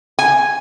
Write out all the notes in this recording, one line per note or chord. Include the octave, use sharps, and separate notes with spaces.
G#5